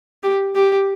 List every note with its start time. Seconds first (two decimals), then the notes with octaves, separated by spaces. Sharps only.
0.23 G4
0.56 G4